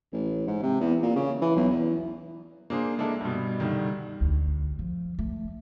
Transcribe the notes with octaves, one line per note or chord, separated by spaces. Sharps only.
A1
G#2
C3
E2
A#2
C#3
E3
B1
E2
A#3 D4 G#4 C5
G#3 A#3 D4 E4 A4
G2 B2
C2 G2 D3 D#3
D2
F3
A3